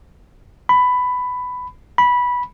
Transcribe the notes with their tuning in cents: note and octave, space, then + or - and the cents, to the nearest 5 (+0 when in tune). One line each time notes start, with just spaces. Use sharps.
B5 +10
B5 -15